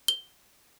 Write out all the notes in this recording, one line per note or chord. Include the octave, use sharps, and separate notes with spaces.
G7